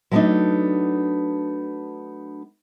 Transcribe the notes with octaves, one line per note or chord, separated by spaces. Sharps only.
F#3 A3 B3 C4 D4 D#4